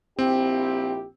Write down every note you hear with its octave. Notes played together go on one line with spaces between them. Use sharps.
A#1 C4 E4 G4